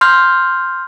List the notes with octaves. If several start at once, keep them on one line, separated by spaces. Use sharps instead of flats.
C6 F6 G6